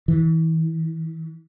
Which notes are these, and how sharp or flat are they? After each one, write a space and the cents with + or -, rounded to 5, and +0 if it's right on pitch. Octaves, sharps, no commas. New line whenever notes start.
E3 -35